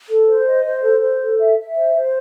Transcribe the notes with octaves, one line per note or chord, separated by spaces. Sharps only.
A4
C5
D#5
C5
A4
C5
A4
E5
E5
C5
C5